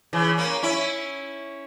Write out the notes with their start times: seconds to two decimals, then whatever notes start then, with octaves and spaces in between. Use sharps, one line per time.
0.13 C#3 E3
0.37 A#3 C#4
0.63 C#4 E4